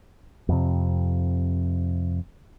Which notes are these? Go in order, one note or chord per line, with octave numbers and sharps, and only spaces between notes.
F2 C3